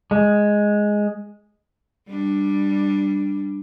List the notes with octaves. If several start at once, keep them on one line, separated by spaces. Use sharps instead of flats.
G#3
G3 D4